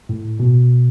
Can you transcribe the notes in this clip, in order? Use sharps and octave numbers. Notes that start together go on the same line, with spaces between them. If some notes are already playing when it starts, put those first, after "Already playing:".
A2
B2